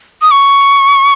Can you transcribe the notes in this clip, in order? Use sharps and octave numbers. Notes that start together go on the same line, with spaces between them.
D#6
C#6